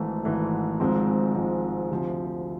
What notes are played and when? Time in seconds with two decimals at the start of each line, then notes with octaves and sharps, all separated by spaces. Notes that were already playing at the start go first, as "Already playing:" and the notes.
Already playing: G#1 G#2 E3 A3
0.24 G#1 G#2 E3 A3
0.80 G#1 G#2 F3 G#3 C4
1.35 G#1 G#2 F3 G#3 C4
1.90 D2 C3 F3